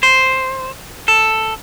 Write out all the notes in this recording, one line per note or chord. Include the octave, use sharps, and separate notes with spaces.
C5
A4